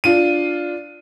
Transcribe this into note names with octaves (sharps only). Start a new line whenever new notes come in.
D4 F4 D#7